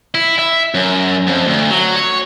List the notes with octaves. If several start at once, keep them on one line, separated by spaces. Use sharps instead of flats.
E4
E5
F#2
F2
D2
F#3
C#5